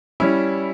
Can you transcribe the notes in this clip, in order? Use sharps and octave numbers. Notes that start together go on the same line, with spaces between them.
G3 C#4 E4